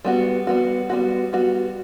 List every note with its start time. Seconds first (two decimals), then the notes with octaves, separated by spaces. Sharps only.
0.05 G3 B3 F#4
0.47 G3 B3 F#4
0.90 G3 B3 F#4
1.33 G3 B3 F#4